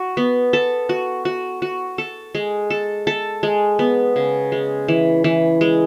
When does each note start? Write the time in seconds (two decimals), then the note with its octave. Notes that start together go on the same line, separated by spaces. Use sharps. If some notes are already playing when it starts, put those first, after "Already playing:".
Already playing: F#4
0.17 B3
0.53 A4
0.89 F#4
1.25 F#4
1.62 F#4
1.98 A4
2.35 G#3
2.70 A4
3.07 A4
3.43 G#3
3.79 B3
4.16 C#3
4.52 G#3
4.88 E3
5.24 E3
5.61 G#3